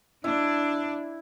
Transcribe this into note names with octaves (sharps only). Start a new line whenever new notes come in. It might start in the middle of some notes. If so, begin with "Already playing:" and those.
D4 E4